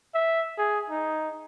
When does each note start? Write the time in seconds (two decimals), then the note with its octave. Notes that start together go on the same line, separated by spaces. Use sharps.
0.15 E5
0.58 G#4
0.90 D#4